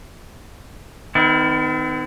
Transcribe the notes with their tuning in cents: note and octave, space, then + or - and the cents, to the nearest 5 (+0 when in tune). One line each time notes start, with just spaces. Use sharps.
D#3 +0 B3 +45 E4 -25